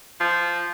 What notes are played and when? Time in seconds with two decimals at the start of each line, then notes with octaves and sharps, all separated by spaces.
0.20 F3